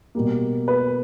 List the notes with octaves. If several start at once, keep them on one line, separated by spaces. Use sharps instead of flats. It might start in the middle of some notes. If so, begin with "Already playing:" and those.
B2 G3 A#3
B4